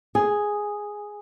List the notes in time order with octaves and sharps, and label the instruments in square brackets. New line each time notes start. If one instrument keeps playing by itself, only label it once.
[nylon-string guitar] G#4